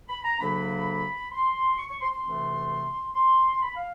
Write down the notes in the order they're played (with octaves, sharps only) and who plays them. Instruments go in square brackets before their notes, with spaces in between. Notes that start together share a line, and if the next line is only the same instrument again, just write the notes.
[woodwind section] B5
A#5
D2 C#3 F#3 A#3 D4 B5
C6
C#6
C#6
C6
C6
D2 C3 E3 A3 C4
C6
B5
F5